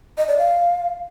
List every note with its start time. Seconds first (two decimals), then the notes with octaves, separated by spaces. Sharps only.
0.18 D#5
0.28 D5
0.38 F5